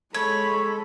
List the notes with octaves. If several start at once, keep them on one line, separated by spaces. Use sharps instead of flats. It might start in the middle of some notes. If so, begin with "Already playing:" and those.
G#3 A4 C#5 B5